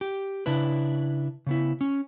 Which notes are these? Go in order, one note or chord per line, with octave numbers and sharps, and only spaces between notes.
G4
C#3 D4 E4 B4
C#3 B3 E4
C#4